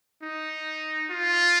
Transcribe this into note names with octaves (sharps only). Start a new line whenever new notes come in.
D#4
F4